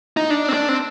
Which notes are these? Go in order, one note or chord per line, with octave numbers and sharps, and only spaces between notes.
D#4
D4
C4
D4
C4